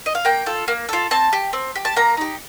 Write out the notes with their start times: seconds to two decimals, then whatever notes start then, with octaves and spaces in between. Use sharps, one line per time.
0.06 D#5
0.15 F5
0.25 A#3 G5
0.46 F4 A4
0.68 A#3
0.89 F4 A4
1.11 C4 A5
1.33 G4
1.53 C4
1.75 G4
1.85 A5
1.96 A#3 A#5
2.17 D#4 G4